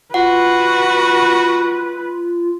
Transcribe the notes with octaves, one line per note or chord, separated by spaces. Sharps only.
F4 F#4 B4 F#5